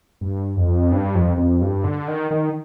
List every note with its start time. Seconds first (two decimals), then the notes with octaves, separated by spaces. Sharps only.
0.21 G2
0.56 F2
0.92 G2
1.15 F2
1.37 F2
1.62 G2
1.84 D3
2.08 D#3
2.31 D#3